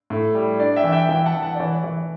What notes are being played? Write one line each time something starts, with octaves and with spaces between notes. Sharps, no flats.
A2
G3
D4 D5
E5 G5
E3
E5 G5
E3 E5 G5
F#5 A5
E3
F#5 A5
D5
E3 C#5
E3